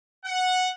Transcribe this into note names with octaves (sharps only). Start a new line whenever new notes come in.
F#5